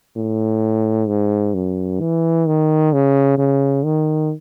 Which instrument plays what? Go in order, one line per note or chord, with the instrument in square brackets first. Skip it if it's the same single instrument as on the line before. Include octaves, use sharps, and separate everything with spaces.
[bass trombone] A2
G#2
F#2
E3
D#3
C#3
C#3
D#3